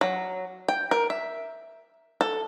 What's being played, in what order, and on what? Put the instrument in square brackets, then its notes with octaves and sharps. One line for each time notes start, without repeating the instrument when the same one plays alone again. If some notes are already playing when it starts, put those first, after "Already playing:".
[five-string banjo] F#3
G5
A#4
E5
A4